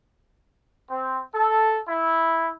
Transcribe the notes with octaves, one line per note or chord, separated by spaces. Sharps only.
C4
A4
E4